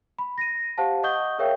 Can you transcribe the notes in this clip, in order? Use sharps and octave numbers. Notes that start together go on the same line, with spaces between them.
B5
A#6 D#7
G4 C5 F5 F#5 A5
D#5 F#5 C#6 D#6 G6 G7
G#4 A#4 C#5 E5 F5 G5